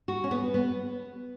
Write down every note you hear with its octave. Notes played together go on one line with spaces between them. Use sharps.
F#4
C#4
B3
B3